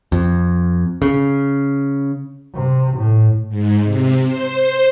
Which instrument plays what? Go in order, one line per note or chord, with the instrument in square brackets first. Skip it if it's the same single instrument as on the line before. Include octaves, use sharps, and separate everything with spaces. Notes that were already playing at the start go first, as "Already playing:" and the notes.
[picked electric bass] F2
C#3
[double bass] C3
A2
[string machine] G#2
C3
C5